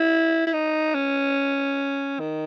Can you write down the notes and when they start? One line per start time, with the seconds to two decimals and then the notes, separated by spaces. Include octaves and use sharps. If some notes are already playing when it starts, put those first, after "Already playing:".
Already playing: E4
0.47 E4
0.53 D#4
0.94 C#4
2.20 D#3